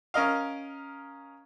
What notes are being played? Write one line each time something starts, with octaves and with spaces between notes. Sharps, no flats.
C#4 A#4 D#5 F5